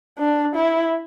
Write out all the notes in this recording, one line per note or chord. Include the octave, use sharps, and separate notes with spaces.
D4
E4